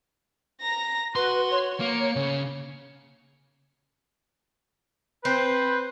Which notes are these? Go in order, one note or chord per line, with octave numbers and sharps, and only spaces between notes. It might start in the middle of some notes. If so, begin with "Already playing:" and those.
A#5 A#6
F#4 B4 C6
C#5
A#3 C#7
C#3
C4 B4 C5